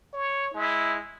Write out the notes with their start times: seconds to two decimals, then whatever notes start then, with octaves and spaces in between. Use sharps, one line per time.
0.14 C#5
0.54 G#3 E4